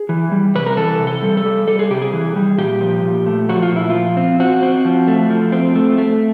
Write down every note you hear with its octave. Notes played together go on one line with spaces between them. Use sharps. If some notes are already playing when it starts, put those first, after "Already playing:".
Already playing: G#4
E3
G3
C3 B4
A#4
E3 A4
C3
A4
G3
A4
G3
G3 A4
G#4
C3 G4
G#4
E3
G3
A#2 G4
F3
A#2
A3
F3 F#4
F4
A#2 E4
F3 F4
C4
C4 F#4
C4
F3
A3
F3
C4
A3
A3